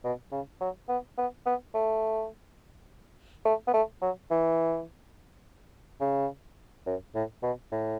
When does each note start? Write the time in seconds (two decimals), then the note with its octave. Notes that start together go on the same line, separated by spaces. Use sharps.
0.04 B2
0.32 C#3
0.61 F#3
0.89 B3
1.18 B3
1.46 B3
1.75 A3
3.45 A3
3.67 B3
3.74 A3
4.02 F#3
4.31 E3
6.01 C#3
6.86 F#2
7.15 A2
7.43 B2
7.72 A2